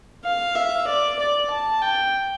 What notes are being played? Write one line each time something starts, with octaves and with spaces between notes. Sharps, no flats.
F5
E5
D5
D5
A5
G5